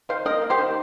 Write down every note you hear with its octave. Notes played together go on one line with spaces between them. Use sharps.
D#3 C5 F5
A#3 A#4 D#5
A#3
G4 C5
D#3